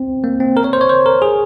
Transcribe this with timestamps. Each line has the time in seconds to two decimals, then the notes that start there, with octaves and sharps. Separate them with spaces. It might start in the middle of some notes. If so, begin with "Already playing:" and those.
Already playing: C4
0.24 A#3
0.40 C4
0.57 A#4
0.64 C#5
0.73 C5
0.81 C#5
0.89 C5
1.06 A#4
1.22 G#4